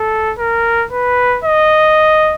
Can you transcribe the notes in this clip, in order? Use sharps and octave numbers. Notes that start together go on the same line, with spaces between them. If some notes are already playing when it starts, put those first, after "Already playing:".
Already playing: A4
A#4
B4
D#5